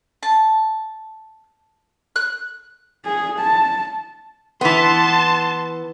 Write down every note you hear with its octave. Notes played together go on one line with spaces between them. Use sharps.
A5
F#6
G#4
A5
E3 B3 A5 C6